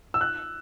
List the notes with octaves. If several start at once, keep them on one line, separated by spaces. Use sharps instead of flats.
E6
F#6